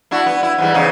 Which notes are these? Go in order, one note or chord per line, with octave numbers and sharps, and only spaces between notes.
D4 E4 F#4
B3
E4
G#2 E3 G3
E2 C#3 D#4